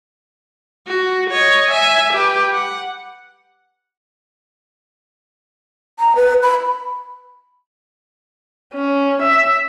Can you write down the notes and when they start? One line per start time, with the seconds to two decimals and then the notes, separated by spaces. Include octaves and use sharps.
0.87 F#4
1.30 C#5 D#5
1.70 E5 G#5
2.13 G4 B4
2.53 F#5
5.99 A#5
6.16 B4
6.43 B5
8.74 C#4
9.22 E5